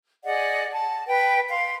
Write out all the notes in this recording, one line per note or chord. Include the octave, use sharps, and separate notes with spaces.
G#4 D5 D#5 F#5
A5
B4 G5
F5 C6